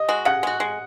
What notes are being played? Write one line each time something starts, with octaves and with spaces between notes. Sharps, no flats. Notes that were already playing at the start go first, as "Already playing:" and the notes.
Already playing: D#5
G#3 F#4
C#3 F#5
G#3 F#4
G#3